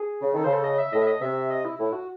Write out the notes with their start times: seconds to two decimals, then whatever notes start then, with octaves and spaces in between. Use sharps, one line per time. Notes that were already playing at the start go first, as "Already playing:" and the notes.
Already playing: G#4
0.21 C#3
0.33 D#3 A4
0.44 C#3 C5
0.53 A4
0.64 D#5
0.78 E5
0.92 A2 D#5
1.02 E5
1.07 D#5
1.21 C3 E5
1.50 D#5
1.65 E4
1.78 A2 E4
1.93 F#4